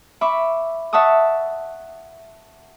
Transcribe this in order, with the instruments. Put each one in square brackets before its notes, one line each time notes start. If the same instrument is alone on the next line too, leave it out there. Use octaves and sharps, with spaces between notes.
[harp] E5 B5 C#6 D6
E5 F#5 A5 C#6 D#6